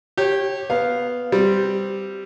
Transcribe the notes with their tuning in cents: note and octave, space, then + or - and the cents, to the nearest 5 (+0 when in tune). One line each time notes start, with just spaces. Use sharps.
G4 +0 C#5 -25
B3 +0 F5 +0
G3 +0 C4 -5